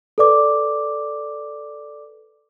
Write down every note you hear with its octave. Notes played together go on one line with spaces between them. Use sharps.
A4 B4 D5 D6